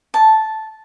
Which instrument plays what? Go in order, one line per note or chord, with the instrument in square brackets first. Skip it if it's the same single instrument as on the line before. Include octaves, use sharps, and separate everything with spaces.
[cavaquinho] A5